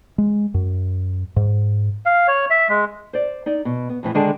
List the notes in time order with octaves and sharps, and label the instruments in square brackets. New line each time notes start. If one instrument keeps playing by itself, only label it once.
[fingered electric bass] G#3
F#2
G#2
[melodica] F5
C#5
E5
G#3
[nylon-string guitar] C5 D5
D#4 D5
B2
B3
F2 A2 E3
D3 D#3 G#3 D4 G#4 A5